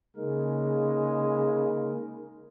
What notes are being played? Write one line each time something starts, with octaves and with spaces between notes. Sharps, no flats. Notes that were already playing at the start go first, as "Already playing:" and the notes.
C#3 G#3 A#3 D#4 A#4